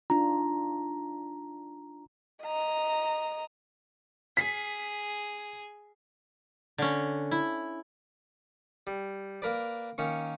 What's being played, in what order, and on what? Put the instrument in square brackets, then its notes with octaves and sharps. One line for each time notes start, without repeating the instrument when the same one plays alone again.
[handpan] D4 D#4 F4 [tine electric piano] A#5
[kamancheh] D#5 A#5
[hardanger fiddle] G#4 [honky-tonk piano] B6 C7
[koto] D3 C#4
E4
[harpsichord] G3
A#3 A#4 B4 D5
D#3 A#3 C#4 C#6